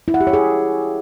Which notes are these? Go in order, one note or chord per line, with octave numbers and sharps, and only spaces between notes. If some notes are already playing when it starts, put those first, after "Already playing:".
E4
F#5
G4
C#5
G#4